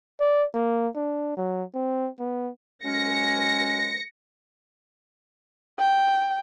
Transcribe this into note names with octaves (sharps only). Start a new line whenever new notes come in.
D5
A#3
D4
F#3
C4
B3
F#3 G#3 C#4 A#6 C#7
G5